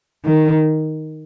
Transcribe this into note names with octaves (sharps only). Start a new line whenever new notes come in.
D#3